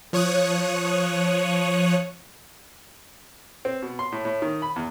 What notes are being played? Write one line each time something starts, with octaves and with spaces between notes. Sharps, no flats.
F3 C#5 C#6 D#6 F#6
C4
B2
C6
A2
A2
D#3
B5
E2